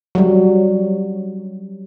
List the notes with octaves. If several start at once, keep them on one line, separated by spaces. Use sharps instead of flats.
F#3 G3